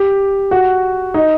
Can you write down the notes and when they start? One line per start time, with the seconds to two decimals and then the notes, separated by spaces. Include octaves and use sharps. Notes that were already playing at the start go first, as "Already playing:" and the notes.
Already playing: G4
0.51 F#4
1.14 D#4